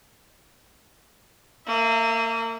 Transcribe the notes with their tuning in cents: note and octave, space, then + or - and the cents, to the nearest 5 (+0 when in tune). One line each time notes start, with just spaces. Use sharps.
A#3 -30 E5 +0